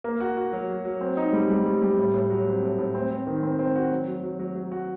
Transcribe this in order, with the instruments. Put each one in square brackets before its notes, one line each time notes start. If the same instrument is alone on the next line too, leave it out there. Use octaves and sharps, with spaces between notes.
[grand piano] A#3
F#4
F#4
F#3
F#3
F#3
C4
D#4
G3
G3
G3
G3
A2
A2
F#3
C4
A2
A2
C4
C4
D#3
C4
C4
F#4
F#3
F#3
F#3
F#3
F#3
F#4